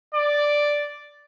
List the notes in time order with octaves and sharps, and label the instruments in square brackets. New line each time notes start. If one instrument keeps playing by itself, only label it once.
[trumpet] D5